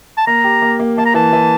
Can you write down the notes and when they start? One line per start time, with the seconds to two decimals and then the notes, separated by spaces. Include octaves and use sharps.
0.17 A5
0.27 A#3 A#5
0.44 G4
0.62 A#3
0.80 A#3
0.98 A#3 A5
1.06 A#5
1.14 E3 A5
1.33 E3